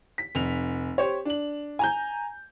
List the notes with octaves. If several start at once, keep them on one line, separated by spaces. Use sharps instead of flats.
B6
F1 F7
G4 C5 C#5
D4 F#7
G#5 A#5 G6